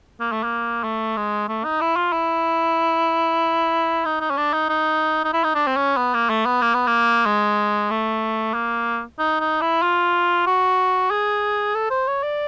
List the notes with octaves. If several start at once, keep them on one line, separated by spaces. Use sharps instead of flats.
A#3
A3
A#3
A3
G#3
A3
D#4
E4
F4
E4
D#4
D#4
C#4
D4
D#4
D#4
D#4
E4
D#4
D4
C4
C#4
B3
A#3
A3
B3
A#3
B3
A#3
G#3
A3
A#3
D#4
D#4
E4
F4
F#4
G#4
A4
C5
C#5
D5